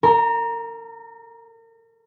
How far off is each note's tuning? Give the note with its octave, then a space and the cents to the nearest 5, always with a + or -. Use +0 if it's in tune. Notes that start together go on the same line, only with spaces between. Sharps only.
A#4 -35 A#5 +15